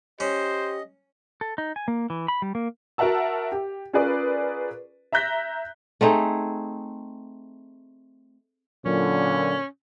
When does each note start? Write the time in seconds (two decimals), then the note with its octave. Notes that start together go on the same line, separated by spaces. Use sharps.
0.20 C#4 G4 C5 D#5
1.41 A4
1.58 D#4
1.76 G#5
1.88 A#3
2.10 E3
2.28 B5
2.42 G3
2.55 A#3
2.98 F#4 A#4 E5 F#5 A5 E6
3.52 G4
3.93 C#4 F4 G#4 A#4 B4 D5
5.12 E5 A#5 F#6 G6 A#6 B6
6.01 A3 C4 D#4 G#4
8.86 A#2 D3 F#3 C#4